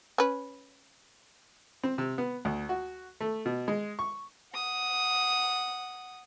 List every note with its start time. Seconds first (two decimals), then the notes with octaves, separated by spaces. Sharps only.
0.18 C#4 B4
1.84 C4
1.98 C3
2.18 B3
2.45 D2
2.69 F#4
3.21 A3
3.46 B2
3.68 G#3
3.99 C#6
4.54 F#5 D#6